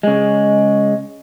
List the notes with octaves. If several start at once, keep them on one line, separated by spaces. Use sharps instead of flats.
C#3 G#3